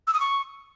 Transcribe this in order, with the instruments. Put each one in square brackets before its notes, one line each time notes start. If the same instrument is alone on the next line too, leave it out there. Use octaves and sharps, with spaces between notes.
[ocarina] E6
D#6
C#6